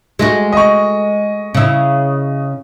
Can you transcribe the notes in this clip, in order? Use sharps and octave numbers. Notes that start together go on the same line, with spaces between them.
G#3 A3 F#4
D#5 C#6
C#3 E4